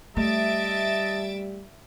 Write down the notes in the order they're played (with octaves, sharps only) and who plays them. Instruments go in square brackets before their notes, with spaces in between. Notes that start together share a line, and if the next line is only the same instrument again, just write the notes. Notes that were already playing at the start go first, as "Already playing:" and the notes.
[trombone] G3 [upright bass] A3 [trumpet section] D#5 A5 [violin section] E5 A6 D7